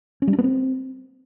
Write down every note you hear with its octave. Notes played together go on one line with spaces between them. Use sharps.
C#4
G3
D4
B3
C4